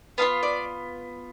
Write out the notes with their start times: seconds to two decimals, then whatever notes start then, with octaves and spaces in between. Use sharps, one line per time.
0.18 B3 D4 F4 F5
0.43 D5